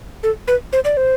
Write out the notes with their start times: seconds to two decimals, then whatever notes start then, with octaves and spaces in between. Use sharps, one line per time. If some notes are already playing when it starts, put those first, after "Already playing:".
0.23 A4
0.48 B4
0.73 C5
0.84 D5
0.97 C5